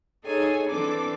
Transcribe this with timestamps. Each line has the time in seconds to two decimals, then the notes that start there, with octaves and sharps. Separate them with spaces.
0.23 D#4 G#4 A4 C#5 G#5
0.67 E3 C4 D4 A4 D6